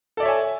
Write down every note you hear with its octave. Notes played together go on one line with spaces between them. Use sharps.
A4 C#5 D5 E5 G#5